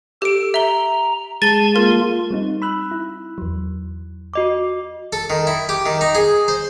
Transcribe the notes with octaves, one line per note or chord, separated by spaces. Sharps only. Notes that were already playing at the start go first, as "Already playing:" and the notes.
G4 A4 D7
E5 A#5 G7
G#3 G#4 A5 A6 G7
A#3 F4 A#4
G3 C4 D#4
B5 E6 F#6
E4
E2 F#3
F#4 D#5 D6
A4
D#3
E4
G4
D#3
D#4
G#4
C5